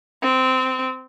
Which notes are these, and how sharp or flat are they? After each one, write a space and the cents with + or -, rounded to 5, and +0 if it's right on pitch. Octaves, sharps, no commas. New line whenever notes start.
C4 -15